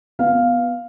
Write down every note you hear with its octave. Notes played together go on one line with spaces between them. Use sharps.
B3 F5